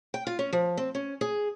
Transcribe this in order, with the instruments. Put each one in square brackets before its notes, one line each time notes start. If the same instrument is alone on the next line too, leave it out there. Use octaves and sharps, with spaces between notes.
[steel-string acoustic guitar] G5
F4
C#4
F3
C4
C#4
G#4